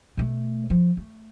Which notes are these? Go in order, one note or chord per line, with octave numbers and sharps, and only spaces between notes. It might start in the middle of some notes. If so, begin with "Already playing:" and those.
B2 A3
F3
A3